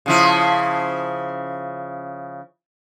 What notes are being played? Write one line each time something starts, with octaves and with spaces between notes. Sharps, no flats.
C#3 F3 E4